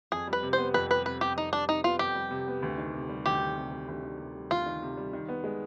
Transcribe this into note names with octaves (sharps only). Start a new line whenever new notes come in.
F2 G#4
G3
B4
C3
C5
B3
F2 B4
G3 B4
C3 B4
B3 G4
F2 D#4
G3 D4
C3 D#4
B3 F4
F2 G4
G3
C3
B3
D2
D#3
C3
G3
D2 G4
D#3
C3
G3
D2
D#3
C3
G3
D2 F4
D#3
C3
G3
D#3
B3
G#3